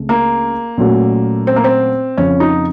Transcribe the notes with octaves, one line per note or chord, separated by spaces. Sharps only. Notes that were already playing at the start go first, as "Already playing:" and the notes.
Already playing: C#2 C#3 A3 C4
A#3
A#2 F#3 A3 C#4 F#4
C4
A#3
C4
F2 C#3 F3 C#4
D#4